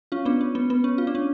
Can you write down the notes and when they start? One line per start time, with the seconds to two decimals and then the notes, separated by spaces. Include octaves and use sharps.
0.12 C#4 F4
0.25 B3 D4
0.41 C#4
0.55 B3
0.70 B3
0.84 C#4
0.98 F4
1.07 D4
1.15 C#4